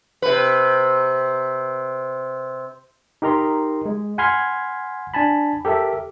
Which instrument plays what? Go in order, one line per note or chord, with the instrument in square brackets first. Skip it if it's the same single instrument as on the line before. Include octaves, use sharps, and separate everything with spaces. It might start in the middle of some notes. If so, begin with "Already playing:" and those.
[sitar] C3 B4
[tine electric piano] D#4 G4 A#4 A#5 C6
G#3
F#5 G#5 B5 C6 F6 G#6
D4 G#5 A5 B5
G4 A4 A#4 E5